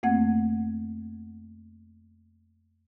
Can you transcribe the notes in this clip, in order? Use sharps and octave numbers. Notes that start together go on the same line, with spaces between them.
F2 A3 A#3 C4 F#5 G#6